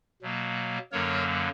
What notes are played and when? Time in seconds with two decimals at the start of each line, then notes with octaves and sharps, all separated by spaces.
0.22 B2 F#3 A#3
0.92 F#2 D3 F#3 A#3 A#4 C#5